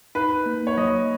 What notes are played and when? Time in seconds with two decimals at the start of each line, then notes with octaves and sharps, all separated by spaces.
0.15 D#4 B4
0.46 A#3
0.67 C#5
0.77 F#3 D#5